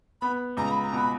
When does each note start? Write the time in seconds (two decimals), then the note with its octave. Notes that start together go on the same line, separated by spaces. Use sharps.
0.21 B3 B5
0.57 C#2 A#5
0.71 B5
0.84 A#5
0.93 B2 B5